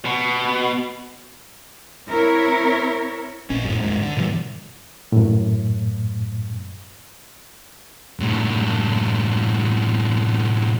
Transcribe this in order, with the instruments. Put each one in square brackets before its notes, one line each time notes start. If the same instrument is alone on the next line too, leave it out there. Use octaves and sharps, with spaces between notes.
[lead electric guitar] B2
[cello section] C4 E4 A#4 C#5
[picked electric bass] A#1 C#4
F#2 A2
D#2 G#2
D3
G#2 B2 E3 G3
[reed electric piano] F#2 A2
[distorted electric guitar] F#2 A2